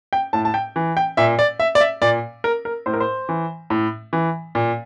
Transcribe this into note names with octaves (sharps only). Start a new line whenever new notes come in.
G5
A2 A5
A5
G5
E3
G5
A#2 E5
D5
E5
D5
E5
A#2 D5
A#4
A#4
A2 C5
A#4
C5
E3
A2
E3
A#2